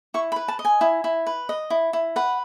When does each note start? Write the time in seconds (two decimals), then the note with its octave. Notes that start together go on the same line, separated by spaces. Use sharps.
0.14 E4 C#6
0.32 B5
0.36 B4
0.48 A5
0.59 D#5
0.65 G#5
0.81 E4
1.04 E4
1.27 B4
1.49 D#5
1.70 E4
1.93 E4
2.16 B4 F#5